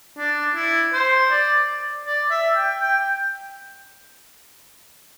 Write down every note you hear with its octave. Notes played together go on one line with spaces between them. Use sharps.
D4
E4
C5
D5
D5
E5
G5
G5